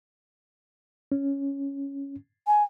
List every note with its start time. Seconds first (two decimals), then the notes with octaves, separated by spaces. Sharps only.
1.12 C#4
2.47 G#5